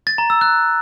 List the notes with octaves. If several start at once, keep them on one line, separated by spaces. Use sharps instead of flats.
A6
A#5
E6
F#6